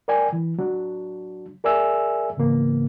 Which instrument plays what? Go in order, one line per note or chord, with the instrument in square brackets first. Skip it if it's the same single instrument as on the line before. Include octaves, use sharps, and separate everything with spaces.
[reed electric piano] A#4 D5 G5 G#5
E3
F#3 D4
G#4 A#4 D5 E5 G#5 E6
G#2 C#3 E3 A#3 B3